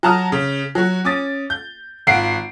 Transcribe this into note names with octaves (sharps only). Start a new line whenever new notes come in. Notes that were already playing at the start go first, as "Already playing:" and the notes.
F#3 A5 A#5 D#6 F6
C#3
F#3 F#4
C#4 D6 D#6 A6
G6
G#1 F4 F#5 C7 D7